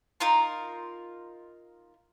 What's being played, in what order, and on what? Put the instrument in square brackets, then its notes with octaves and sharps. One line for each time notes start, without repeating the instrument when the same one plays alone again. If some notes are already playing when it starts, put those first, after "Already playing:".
[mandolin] D#4 F4 A#4 C6